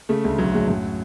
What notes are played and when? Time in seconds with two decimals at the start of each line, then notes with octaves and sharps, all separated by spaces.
0.09 C#3 A3
0.24 D2 G#3
0.38 B1 F#3
0.54 A2 G#3
0.68 F#2 F#3